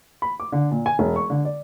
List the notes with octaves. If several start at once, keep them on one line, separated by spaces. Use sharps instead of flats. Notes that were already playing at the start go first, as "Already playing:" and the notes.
B5
D6
D3
A#2
G#5
E1
C#6
D3
D5